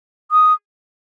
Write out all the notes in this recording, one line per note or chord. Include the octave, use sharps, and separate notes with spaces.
D#6